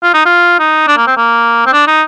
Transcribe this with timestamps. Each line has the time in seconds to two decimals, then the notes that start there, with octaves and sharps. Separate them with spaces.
0.03 F4
0.14 D#4
0.25 F4
0.59 D#4
0.87 D4
0.97 A#3
1.07 C4
1.17 A#3
1.66 C4
1.73 D4
1.87 D#4